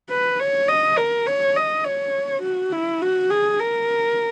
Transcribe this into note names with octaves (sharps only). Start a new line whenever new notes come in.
B4
C#5
D#5
A#4
C#5
D#5
C#5
F#4
E4
F#4
G#4
A#4